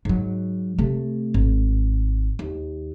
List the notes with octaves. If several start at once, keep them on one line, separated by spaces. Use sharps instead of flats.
G#2 F#3
C3 A3
G#1
D#2